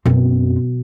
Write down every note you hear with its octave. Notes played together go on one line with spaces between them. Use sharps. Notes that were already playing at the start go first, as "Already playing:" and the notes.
F#2 B2 C4